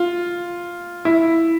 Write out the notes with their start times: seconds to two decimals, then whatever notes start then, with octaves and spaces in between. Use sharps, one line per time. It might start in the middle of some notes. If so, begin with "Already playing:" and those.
Already playing: F4
1.05 E4